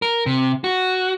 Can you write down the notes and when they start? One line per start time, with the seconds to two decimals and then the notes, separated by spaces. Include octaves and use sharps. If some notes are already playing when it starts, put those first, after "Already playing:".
0.02 A#4
0.26 C3
0.64 F#4